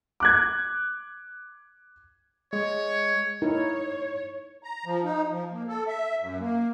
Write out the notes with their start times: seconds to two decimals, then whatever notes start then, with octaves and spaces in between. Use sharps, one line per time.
0.20 D6 F#6 G#6
2.53 G#3 C#5
3.42 D#4 E4 A#4 C#5
4.63 A#5
4.86 F3
5.04 D#4
5.29 F3
5.51 A#3
5.68 A4
5.88 E5
6.20 F#2
6.40 A#3